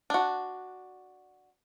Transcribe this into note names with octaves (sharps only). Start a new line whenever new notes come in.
D4 F#4